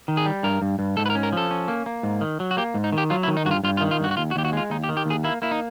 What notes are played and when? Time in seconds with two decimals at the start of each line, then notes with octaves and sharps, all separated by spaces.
0.08 D#3
0.17 G#4
0.26 G3
0.43 G2 A#4
0.62 G2
0.79 G2
0.97 G#2 A4
1.06 B4
1.10 A#4
1.15 C#4
1.23 A#4
1.33 F3 A4
1.51 C#4
1.68 A#3
1.86 A#3
2.03 G#2
2.21 D#3
2.40 F#3
2.51 F#4
2.57 A#3 G4
2.74 G#2
2.84 D#4
2.92 D#3
2.98 G4
3.10 F#3 F4
3.23 E4
3.28 D#3
3.37 D#4
3.45 G2 F#4
3.51 F4
3.64 G2 F4
3.77 F4
3.81 D#3
3.91 F4
4.00 G2 F#4
4.11 F#4
4.17 D#2 F4
4.31 F#4
4.36 D#2 G4
4.45 F#4
4.53 G#3 F4
4.70 D#2 D#4
4.84 G4
4.89 D#3
4.97 G4
5.06 D#2 G#4
5.24 A#3 E4
5.42 A#3 E4
5.51 D#4